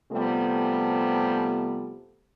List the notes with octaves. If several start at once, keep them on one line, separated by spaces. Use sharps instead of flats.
C3 F3 G3 A3 B3